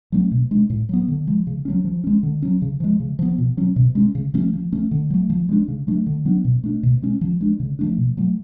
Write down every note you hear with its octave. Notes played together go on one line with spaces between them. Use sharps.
F#3 A3 C#4
B2
G#3 D4
A2
F#3 B3
D3
F3 G#3
C#3
F#3 A3 C#4
F3
G#3 C#4
D3
F#3 C#4
C#3
F3 G#3
C#3
F3 B3
B2
F#3 C#4
B2
G#3 C#4
C#3
F3 A3 C#4
F3
A3 C#4
D3
F#3 A3
F3
G#3 B3 D4
C#3
F#3 A3 D4
D3
F#3 B3 D4
B2
A3 D4
B2
G#3 C#4
F3
G#3 D4
C#3
F3 A3 D4
B2
F#3 A3